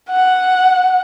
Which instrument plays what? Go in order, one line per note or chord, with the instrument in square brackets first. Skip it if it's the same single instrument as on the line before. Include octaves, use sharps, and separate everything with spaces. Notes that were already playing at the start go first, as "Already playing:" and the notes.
[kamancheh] F#5